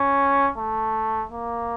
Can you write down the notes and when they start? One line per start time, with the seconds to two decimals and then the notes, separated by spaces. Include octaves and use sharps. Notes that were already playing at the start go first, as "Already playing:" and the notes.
Already playing: C#4
0.58 A3
1.31 A#3